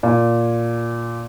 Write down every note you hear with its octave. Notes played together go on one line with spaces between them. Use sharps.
A#2